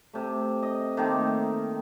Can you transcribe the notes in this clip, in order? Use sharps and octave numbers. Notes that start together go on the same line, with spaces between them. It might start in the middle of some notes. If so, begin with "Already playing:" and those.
C3 A3
D#5
D#3 A3 A#3 C4